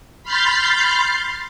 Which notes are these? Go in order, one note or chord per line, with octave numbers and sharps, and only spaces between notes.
B5 C6 F6 G6 A6 C7